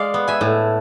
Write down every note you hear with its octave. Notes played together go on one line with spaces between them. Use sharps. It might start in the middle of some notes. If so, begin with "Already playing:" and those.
Already playing: G#3 D5 F5
B3
E5 G#5
A2